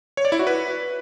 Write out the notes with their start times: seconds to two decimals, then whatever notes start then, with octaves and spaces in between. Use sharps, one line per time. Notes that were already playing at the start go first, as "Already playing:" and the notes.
0.17 C#5
0.25 D5
0.32 E4
0.39 F#4
0.47 B4